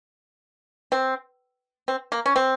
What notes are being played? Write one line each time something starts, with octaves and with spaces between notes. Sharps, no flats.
C4
C4
A#3
C#4
C4